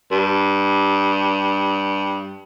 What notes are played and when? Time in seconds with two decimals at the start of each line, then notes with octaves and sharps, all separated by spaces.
0.11 G2